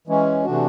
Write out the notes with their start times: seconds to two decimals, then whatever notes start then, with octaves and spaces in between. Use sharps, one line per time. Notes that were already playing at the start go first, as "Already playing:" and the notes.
0.07 E3 G#3 C#4
0.45 C3 E3 A3 D4 F#4